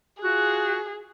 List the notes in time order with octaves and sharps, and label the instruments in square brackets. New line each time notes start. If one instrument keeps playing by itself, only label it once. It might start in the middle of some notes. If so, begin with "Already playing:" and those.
[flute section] F4 F#4 F#6 [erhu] G#4